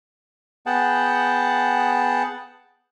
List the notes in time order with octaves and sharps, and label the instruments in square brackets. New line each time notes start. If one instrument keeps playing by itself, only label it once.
[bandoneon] B3 G#4 F#5 G5 A5